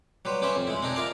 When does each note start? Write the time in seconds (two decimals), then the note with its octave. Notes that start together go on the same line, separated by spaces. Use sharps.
0.25 F#3 G3 B4 C5
0.42 C#4 G4 B4 C5 E5
0.55 F2
0.67 G#3 E4
0.82 C4 D4 D#4 G4 G#4
0.96 E4 F4 A#4 D5 F5